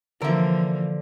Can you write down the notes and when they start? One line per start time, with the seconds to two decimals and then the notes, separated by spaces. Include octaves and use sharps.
0.22 D3 E3 F3 A#3 A#4 E5